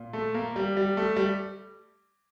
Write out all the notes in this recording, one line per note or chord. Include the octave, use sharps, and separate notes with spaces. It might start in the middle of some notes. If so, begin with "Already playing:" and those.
Already playing: A#2
A3
A#3
G3
G3
A3
G3